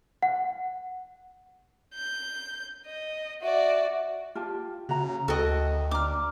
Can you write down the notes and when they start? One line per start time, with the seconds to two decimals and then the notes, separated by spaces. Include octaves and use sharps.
0.23 F#5
1.94 G6
2.86 D#5
3.42 F#4 D5 E5
4.35 F4 G4 A5
4.89 C#3 F#4 A#5
5.28 D2 F#4 A4 D#5 G5 A5
5.91 D4 A#5 D6 F6